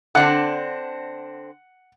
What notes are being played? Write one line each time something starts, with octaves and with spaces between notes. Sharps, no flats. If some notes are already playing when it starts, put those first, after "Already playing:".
D3 C4 D4 F#5